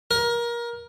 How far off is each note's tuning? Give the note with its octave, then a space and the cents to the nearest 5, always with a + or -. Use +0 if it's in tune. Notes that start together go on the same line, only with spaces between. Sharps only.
A#4 +25